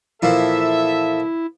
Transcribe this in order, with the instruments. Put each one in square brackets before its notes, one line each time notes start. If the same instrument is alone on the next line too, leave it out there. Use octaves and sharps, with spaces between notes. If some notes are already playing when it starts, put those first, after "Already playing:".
[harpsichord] A#2 E3 F3 [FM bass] E4 [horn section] A4 E5